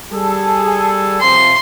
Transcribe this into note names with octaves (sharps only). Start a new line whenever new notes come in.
G3 G#4 A4
C3 F3 C6